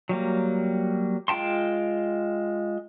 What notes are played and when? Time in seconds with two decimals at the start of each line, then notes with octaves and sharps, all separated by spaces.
0.09 F#3 G3 A#3
1.28 G#3 F4 G5 A5 C6